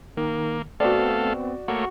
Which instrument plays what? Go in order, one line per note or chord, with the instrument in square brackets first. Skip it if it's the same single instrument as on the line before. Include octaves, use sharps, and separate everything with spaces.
[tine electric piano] D#3 [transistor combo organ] A#3
[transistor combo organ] A3 A4 F5 [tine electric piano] B3 C4 [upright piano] F#4 D5
[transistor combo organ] A3 A#3 C#5 [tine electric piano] F#4